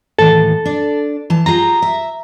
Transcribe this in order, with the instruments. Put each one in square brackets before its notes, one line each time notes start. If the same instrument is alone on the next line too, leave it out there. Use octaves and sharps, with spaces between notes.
[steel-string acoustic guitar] D#2 A2 E3 [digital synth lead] A4
[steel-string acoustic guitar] D4 D5
E3 A5
[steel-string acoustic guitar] F4 G4 G#4 [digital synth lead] A#5
[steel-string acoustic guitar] E5